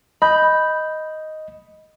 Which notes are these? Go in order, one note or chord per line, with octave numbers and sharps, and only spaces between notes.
D#5 B5 G6